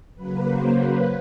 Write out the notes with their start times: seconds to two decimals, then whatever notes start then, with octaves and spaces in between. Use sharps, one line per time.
0.15 C#3 F#3 A#3 B4
0.46 C5
0.77 B4